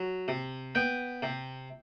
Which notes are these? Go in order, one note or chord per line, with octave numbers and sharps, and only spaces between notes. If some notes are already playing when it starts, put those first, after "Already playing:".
Already playing: F#3
C3
B3 G5
C3